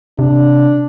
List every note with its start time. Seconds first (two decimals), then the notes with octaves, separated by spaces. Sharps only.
0.19 C3 D4